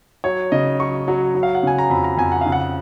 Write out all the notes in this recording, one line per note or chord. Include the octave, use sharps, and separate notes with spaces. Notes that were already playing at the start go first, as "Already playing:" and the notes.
F#3 C#5
C#3 D#5
F#3 C#6
F#3
F#3
F5
F#5
C#3 G#5
A#5
F2 B5
A#5
F2 G#5
F#5
C#3 F5
F#5